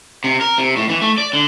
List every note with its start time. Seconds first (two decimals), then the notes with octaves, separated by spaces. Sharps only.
0.24 C3
0.41 A#4
0.58 C3
0.77 A2
0.89 E3
1.02 A3
1.18 D5
1.33 D3